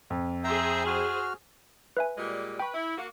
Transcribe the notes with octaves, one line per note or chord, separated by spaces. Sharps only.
F2
G#4 C5 E5 G5 A#5
F#4 F6
B4 E5 G#5
A#2 G3 G#3
B4 G5 C#6
E4
A#3 F#4